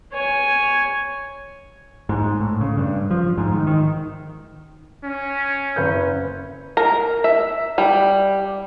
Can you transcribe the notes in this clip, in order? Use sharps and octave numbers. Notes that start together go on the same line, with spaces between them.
C#5 G#5
G#2
A2
C#3
G2
F3
G#2
D#3
D#3
C#4
F#1 B4 G6
A#4
E5
G3